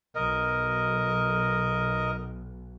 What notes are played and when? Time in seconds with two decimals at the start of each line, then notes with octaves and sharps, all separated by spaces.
0.15 B1 A#4 D#5